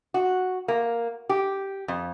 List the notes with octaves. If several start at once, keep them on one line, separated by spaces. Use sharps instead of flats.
F#4
A#3
G4
F2